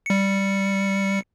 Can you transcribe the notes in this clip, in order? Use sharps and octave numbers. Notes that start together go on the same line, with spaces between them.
G3 C#7